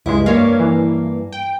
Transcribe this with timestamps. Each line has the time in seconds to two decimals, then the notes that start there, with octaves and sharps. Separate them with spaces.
0.06 C#2 G2 G#3 E4
0.26 G2 A#3 C#5 F5
0.60 E3
1.32 G5